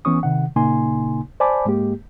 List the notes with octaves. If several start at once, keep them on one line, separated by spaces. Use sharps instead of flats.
E3 B3 C#4 C#6 D#6
C3 D#3 F#5
A#2 C#3 A#3 D#4 G#5 C6
C5 D5 G#5 A5 B5 D6
G#2 G#3 A#3 G4